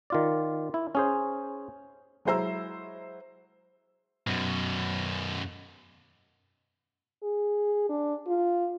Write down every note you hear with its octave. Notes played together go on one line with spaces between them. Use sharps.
D#3 F4 D5
E4
C#4 G#4 C5
F#3 G#3 E4 C5 A#5 E6
F#2 B2
G#4
D4
F4